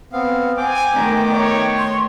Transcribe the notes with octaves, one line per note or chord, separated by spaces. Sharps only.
B3 C4 F5 F#5
C4 G5 G#5 D6
D#3 A3 B3 A#5
C#5 A#5
C6